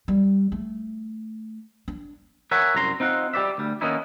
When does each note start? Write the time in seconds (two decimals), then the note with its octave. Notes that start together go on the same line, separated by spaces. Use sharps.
0.08 G3
0.52 A3
1.88 D4
2.51 A#4 C#5 E5 F#5 G#5
2.75 C2 F#2 A#5 C6
3.00 C4 D#4 F4 F#5
3.34 G3 G4 C5 D5 E5
3.58 D2 G3
3.81 D#3 A#3 B3 C#4 D#4 E4